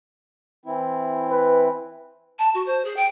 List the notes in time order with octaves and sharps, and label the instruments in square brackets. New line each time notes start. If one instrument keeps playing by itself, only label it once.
[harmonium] E3 C4 E4
[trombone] B4
[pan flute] A5
F#4
C5
G#4
G5